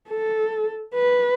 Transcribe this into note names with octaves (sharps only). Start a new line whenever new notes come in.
A4
B4